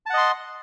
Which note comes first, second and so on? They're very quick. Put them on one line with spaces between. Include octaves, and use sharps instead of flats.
A5 F#5 D#5 C6